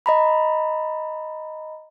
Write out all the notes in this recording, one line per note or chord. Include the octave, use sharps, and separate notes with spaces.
D#5 A#5 B5